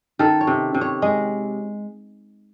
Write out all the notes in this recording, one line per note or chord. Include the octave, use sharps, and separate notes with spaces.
D#3 A4
C#5
C3
C3
C#5
G#3 D#5